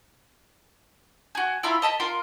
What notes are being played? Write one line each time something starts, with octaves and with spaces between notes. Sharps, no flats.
F#4 G#4
E4 F4 A#5 B5
D#5 A5 B5
F4 A#4 C6